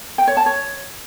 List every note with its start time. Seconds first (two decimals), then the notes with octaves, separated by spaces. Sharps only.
0.18 G5
0.27 C#5
0.37 A5
0.46 C#5